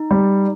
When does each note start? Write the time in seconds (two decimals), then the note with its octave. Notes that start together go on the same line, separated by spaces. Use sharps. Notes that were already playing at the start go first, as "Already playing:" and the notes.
Already playing: D#4
0.11 G3